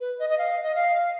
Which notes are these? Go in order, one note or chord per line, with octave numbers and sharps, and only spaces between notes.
B4
D#5
D#5
F5
D#5
F5